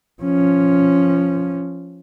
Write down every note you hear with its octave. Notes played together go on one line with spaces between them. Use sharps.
F3 C#4